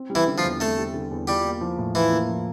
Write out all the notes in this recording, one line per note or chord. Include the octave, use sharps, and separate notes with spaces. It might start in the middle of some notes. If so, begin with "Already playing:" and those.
Already playing: C4
G3
E3 E4
D3
F3 F4
E2
A3 C4 A4
G3
D3
E2
G3 F4 G4
A#3
F3
A2
E3 E4 F4
A#3
F3